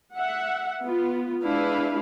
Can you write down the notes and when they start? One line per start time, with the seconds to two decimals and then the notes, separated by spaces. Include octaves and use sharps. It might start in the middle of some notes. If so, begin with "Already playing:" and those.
0.15 E5 F#5
0.82 B3 F4
1.43 G#3 D4 E4 B4 F5